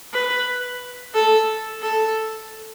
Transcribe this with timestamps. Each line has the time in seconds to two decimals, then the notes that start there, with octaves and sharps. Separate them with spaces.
0.13 B4
1.15 A4
1.82 A4